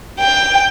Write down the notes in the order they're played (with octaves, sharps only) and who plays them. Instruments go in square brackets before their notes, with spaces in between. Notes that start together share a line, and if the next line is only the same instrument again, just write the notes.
[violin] G5